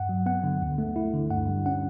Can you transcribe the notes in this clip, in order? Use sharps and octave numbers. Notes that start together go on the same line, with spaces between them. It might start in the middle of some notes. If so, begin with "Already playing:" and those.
Already playing: G2 F#5
F#3
B3 F#5
D3
D2
A3
E4
D3
G2 F#5
G3
C#4 F#5